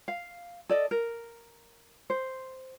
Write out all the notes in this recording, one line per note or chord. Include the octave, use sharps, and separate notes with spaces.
F5
A4 D5 D#5
A#4
C5